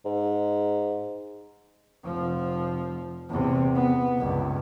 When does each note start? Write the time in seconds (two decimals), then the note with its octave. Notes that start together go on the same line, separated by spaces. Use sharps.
0.05 G#2
2.04 F1 F3
3.30 E2 C3
3.75 B3
4.18 C#2 G2